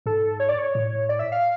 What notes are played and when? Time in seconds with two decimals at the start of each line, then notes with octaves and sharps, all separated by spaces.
0.06 G#2 A4
0.40 C#5
0.49 D5
0.58 C#5
0.75 A2
1.09 D5
1.19 E5
1.32 F5